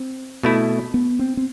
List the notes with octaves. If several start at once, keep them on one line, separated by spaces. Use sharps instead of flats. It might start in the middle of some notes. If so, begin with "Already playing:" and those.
Already playing: C4
B2 A3 E4
B3
C4
C4